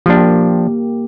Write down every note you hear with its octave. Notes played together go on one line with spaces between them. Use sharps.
F3 A#3 D4 G4